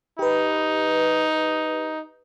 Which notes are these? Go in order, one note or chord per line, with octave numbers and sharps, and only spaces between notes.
D#4 G4 B4